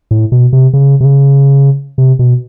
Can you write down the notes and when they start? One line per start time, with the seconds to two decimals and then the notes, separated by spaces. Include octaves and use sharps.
0.11 A2
0.32 B2
0.53 C3
0.73 C#3
1.00 C3
1.05 C#3
1.98 C3
2.19 B2